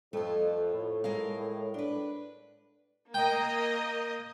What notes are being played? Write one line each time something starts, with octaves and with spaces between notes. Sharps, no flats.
F2 A3 F4
A2
G#3 A#4 F5
D4 B4
A#3 D#5 G5